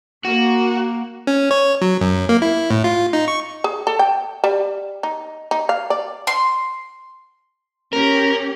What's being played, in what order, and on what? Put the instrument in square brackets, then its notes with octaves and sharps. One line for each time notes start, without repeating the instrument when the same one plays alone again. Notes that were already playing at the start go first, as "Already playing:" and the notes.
[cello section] A#3 [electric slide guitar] F#4
[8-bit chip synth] C#4
C#5
F#3
F#2
A#3
E4
A2
F4
D#4
C#6
[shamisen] G#4
A4
G5
G3
D#4
D#4
F5
D5
[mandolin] C6
[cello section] C#4 G4 [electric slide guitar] A#4